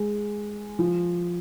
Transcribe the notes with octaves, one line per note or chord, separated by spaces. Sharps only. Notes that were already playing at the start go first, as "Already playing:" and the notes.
Already playing: G#3
F3